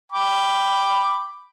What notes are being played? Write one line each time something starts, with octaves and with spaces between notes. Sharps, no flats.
G5 B5 D6